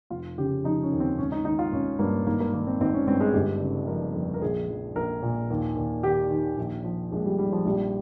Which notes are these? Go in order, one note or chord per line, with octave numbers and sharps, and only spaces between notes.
F1 F4
C#3 G4
F3 D#4
C#4
D#2
C4
G#1 C#4
D#4
D#3 D#4
F4
G#1 C#4
G2 A#3
G#1 A#3
A#3
D#3 A#3
C4
G#1 C4
C#4
G2 C4
G#3
G1 G4
C#3
F3 A#4
F2
A#4
A#1 G#4
F3
A#1 A#4
A#2
D#2
D#2
D#3 G4
D#3
A#1
F3
A#1 G#3
G3
G#2 G3
F3
A#1 G3